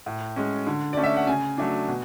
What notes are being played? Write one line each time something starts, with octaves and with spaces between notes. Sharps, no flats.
A2
G#3 C#4
D3
A3 C#4 D5
E5
F#5
C#3 G#5
F#3 A3 D4
B2